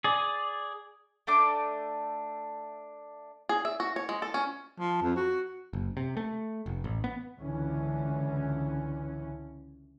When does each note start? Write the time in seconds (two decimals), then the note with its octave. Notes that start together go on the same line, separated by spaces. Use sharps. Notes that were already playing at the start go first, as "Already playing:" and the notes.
0.04 G#4 D5
1.27 A3 D4 D6
3.49 G#4
3.65 E5
3.80 F#4
3.96 C#5
4.09 G#3
4.22 A4
4.34 C#4
4.79 F3
5.02 F2
5.16 F#4
5.73 F#1
5.97 C3
6.17 A3
6.66 F1
6.84 A1
7.04 B3
7.39 C#2 D3 E3 C#4